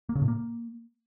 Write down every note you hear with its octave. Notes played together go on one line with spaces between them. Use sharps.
A#3
C#3
A2
A#3